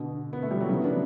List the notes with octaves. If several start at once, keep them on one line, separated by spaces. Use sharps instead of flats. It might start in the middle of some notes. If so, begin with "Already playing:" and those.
Already playing: B2 D3
B3
A3
G3
F#3
C#3 E3
B3 D4